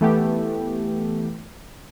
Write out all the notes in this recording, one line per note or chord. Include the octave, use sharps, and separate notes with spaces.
E3 A3 B3 G4